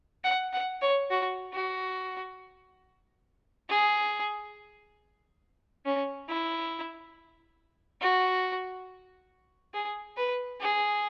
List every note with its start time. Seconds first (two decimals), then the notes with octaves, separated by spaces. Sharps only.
0.24 F#5
0.53 F#5
0.81 C#5
1.10 F#4
1.53 F#4
3.69 G#4
5.85 C#4
6.29 E4
8.01 F#4
9.74 G#4
10.17 B4
10.61 G#4